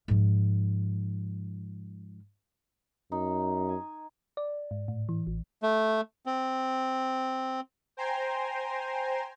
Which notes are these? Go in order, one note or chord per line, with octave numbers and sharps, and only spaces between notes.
G#2 F3
F#2 D#4
G#5
D5
G#2
A2
E3
A1
A3
C4
C5 G5 G#5 A#5 C6